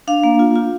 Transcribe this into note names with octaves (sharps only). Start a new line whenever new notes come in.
D4 F5
A#3
F4
F4